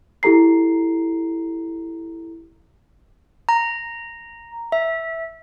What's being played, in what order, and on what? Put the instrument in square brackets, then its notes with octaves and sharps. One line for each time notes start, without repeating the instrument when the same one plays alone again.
[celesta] E4 G4 A4 A#5 C7
[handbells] A#5
E5